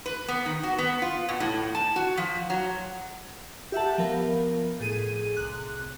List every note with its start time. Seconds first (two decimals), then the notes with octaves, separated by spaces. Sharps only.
0.06 B4
0.28 B3
0.46 D#3
0.63 F#4
0.78 B3
1.02 F4
1.29 B2
1.40 A2
1.75 A5
1.96 F#4
2.17 F3
2.50 F#3
3.72 G4 E5 F#5 A5
3.98 F3 B3 A#4
4.80 A2 G#4 D#7
5.37 C2 F#6